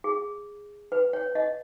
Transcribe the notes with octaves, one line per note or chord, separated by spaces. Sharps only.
G#4
B4
C#5
D#5